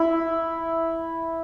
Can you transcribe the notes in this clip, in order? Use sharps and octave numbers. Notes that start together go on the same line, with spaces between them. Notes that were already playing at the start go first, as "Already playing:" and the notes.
Already playing: E4